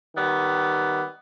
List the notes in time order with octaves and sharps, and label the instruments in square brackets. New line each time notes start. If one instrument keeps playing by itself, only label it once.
[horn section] D#3 G3 B3